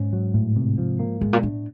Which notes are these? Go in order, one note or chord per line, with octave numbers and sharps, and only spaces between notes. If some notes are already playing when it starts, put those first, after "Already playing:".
Already playing: G#2 C#4
F#3
A2
C3
F3
A#3
A2 G#3
A#2
A2 D4